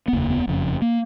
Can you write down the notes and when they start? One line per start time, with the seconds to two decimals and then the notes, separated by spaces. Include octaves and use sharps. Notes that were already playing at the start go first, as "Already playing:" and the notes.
0.08 B3
0.13 F1 D#2 C#3 A#3
0.30 B3
0.47 F#1 F2 C#3
0.82 A#3